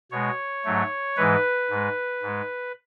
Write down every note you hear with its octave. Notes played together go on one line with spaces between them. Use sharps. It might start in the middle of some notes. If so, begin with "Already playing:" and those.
B2 G#3 C#5
G#2 F#3 A3
G#2 E3 G#3 B4
G#2 G#3
G#2 G#3